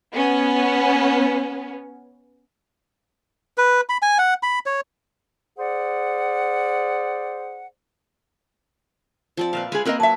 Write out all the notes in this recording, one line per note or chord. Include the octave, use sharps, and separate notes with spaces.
B3 C#4
B4
B5
G#5
F#5
B5
C#5
G#4 C5 D5 F#5
F3 C4 D5
A#2 B4 E5 F5
G#3 G#4 G#5 B5
A#3 C4 A#4 B4 D#5 B5
F#3 E5 A5